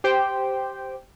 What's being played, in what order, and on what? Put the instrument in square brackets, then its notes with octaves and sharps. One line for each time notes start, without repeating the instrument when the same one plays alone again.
[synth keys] G4 C5 G5